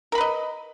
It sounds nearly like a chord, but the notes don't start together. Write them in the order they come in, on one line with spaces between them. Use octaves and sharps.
A#4 B5 B4 D#5